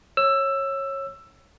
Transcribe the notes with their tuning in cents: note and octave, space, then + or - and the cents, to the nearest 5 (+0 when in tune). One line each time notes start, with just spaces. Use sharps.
C#5 -20 E6 +15